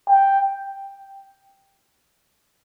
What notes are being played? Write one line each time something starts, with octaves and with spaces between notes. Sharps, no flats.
G5